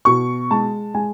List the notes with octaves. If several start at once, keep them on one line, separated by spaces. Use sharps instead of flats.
B2 C#6
G#3 A5
G#3 G#5